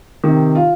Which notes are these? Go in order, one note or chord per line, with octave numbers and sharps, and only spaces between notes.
C3 D#3
F4